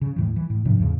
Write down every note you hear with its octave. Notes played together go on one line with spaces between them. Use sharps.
C#3
D#2 A2 E3
E3
A2
G#2 C3 F3 D4
E2 A2 C#3